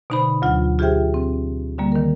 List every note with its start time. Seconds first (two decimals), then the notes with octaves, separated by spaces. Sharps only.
0.10 B2 D3 D#4 C5 B5
0.42 D2 F#3 F4 F#5
0.79 F4 G4 G#4 C5 E5 G5
1.14 C4
1.78 D3 G3 A#3
1.92 D#3 A#4